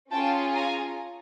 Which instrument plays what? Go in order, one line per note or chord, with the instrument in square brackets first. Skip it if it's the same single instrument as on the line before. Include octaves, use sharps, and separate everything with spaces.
[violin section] C#4 F4 G#4 G5 A5
G#5 A#5